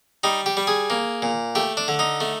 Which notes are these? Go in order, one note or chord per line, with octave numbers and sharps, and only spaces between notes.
G3 D#4
G4
G3
G#4
A#3
A#2
A3 G4
D4
D3
D#4
A3